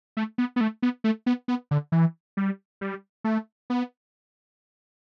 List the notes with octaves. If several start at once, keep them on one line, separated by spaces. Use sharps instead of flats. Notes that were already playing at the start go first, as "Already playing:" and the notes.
A3
B3
B3
A3
B3
A3
B3
B3
D3
E3
G3
G3
A3
B3